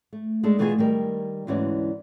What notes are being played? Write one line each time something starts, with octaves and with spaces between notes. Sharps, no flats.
A3
G#3 A3 D4 A4
B2 E3 A3 F4 G#4 G#5
D#3 G3 A#4
D2 G#2 E3 C#4 F#4 D5